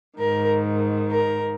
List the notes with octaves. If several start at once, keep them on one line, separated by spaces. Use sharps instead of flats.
G#2 D#3 A#4
A#4